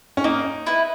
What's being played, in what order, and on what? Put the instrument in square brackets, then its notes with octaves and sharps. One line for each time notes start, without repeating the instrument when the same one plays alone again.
[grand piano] C#4
[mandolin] A#3 [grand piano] D#4
[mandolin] E4 B4